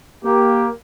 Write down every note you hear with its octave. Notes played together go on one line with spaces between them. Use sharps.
A#3 G4